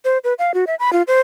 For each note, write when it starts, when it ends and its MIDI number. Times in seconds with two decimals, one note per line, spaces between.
0.05 0.18 72
0.24 0.34 71
0.39 0.52 77
0.54 0.65 66
0.67 0.75 76
0.79 0.93 83
0.93 1.02 65
1.07 1.21 72